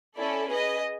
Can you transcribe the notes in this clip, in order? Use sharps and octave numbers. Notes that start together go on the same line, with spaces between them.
C#4 E4 A4 D5
G#4 B4 D#5